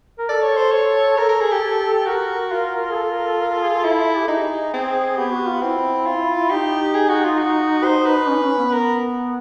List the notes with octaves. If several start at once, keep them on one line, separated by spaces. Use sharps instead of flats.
A#4
A4 D5
C#5
C5
C#5
A4 A#4
A#4
G#4
G4
F#4 A#4
F4
G#4
A4
A#4
A4
A#4
A4
G#4
A4
E4
G4
D#4 G#4
C4
B3 G4
F#4
F4
C4 E4
F4
D#4 G4
G#4
F#4
F4
F#4
C5
B4
C#4
C#4
B3
A#4